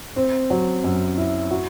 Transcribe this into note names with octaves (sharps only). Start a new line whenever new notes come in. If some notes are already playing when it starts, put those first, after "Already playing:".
C4
F#3
F#2
E4
F#4